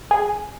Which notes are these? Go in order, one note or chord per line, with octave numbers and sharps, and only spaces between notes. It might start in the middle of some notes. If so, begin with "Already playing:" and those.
G#4